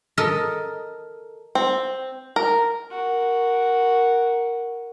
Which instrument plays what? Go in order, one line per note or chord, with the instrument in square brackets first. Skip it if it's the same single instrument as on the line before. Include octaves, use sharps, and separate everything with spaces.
[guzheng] A4 A#4 D#5
[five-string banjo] C4
A#4
[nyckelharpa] F#4 A#4